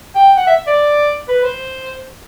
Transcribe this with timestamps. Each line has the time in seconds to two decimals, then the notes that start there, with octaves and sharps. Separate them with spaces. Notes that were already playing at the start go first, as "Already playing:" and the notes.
0.15 G5
0.37 F#5
0.47 E5
0.67 D5
1.28 B4
1.44 C5